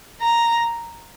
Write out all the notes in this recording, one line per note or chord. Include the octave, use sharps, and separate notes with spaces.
A#5